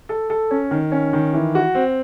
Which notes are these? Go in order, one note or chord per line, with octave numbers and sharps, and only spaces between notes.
A4
A4
C#4
D#3
C#4
D#3
E3
F#4
C4